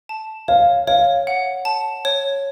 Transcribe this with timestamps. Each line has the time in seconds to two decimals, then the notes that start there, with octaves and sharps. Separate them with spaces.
0.09 A5
0.48 C#5 F5
0.87 C#5 F5
1.27 F#5
1.65 A5
2.05 C#5